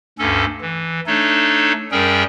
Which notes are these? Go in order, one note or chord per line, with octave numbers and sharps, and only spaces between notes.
D2 G2 C#4 A4
E3
A3 D4 D#4 A4 C#5
F#2 G3 C#4 G#4 A#4 G5